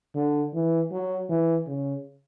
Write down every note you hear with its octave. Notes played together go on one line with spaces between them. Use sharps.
D3
E3
F#3
E3
C#3